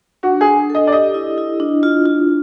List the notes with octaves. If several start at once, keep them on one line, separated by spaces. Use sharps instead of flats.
D4 F#4
G#4
D4
A4 D#5
D5
G4 D#5
E4
E4
D4
F4
F4